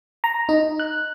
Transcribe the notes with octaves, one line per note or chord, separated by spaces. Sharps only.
A#5
D#4
F#6